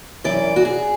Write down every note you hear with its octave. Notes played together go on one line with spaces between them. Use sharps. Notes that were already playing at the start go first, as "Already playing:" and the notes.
F#2 E3 D5
F#4
G#4